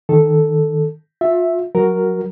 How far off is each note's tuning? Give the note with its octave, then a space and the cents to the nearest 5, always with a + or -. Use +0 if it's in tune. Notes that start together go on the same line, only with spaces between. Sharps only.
D#3 +0 A4 +0
F4 +30 E5 +0
F#3 +0 F#4 +5 A#4 +0